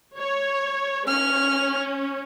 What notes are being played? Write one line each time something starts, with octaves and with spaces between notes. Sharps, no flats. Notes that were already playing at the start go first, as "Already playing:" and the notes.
C#5
C#4 F6